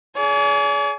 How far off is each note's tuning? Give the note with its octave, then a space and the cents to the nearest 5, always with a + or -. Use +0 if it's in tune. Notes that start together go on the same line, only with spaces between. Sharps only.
G#4 +25 D5 -45